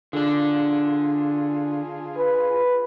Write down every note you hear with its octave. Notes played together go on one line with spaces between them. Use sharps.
D3 D4 F4 G#4
B4